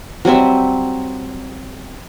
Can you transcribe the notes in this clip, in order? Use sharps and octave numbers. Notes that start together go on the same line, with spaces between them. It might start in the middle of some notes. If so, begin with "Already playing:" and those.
F#3 G3 C4 E5